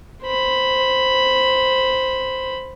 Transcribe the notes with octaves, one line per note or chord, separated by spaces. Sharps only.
C5 B5